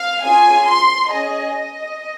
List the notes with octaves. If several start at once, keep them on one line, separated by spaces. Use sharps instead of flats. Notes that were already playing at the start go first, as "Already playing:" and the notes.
Already playing: F5
C#4 F4 G#4 G#5
C6
C#4 G#4 D#5
D#5